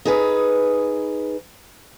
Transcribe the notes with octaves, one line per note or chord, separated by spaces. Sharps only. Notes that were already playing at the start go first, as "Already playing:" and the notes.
D#4 G#4 B4